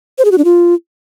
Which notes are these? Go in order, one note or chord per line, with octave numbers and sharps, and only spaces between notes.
C5
G#4
F#4
D4
F4